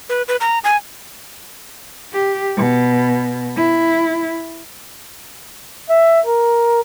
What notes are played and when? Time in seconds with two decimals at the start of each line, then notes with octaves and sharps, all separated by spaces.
0.09 B4
0.28 B4
0.41 A#5
0.64 G#5
2.13 G4
2.57 B2
3.56 E4
5.90 E5
6.26 A#4